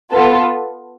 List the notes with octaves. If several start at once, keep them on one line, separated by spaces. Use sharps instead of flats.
B3 F4 A4